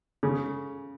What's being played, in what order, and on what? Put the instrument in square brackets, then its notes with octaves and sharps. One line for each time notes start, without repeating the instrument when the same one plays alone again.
[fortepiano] C#3